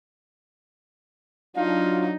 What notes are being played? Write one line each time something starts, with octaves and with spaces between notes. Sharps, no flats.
F#3 D4 D#4 F4 F5